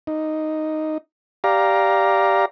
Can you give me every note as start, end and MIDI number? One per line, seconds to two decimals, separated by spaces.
0.07 0.98 63
1.44 2.45 67
1.44 2.45 74
1.44 2.45 77
1.44 2.45 82